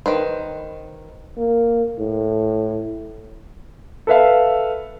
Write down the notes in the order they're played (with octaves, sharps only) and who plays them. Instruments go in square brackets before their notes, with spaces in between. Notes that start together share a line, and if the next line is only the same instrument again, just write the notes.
[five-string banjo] D#3 B4 C5
[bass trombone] A#3
A2
[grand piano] A4 B4 E5 F5